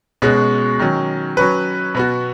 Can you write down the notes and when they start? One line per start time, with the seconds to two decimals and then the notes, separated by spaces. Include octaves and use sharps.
0.22 B2 G#3 C#4 F#4
0.79 D#3 F#3 C#4
1.37 F#3 C#4 B4
1.95 B2 B3 F#4